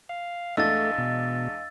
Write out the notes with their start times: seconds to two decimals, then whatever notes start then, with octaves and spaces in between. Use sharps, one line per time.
0.09 F5
0.57 E2 G#3 A3 D4 D#5 F5 E6 A6
0.98 B2